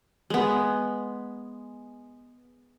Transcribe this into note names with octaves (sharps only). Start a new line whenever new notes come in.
G#3 B3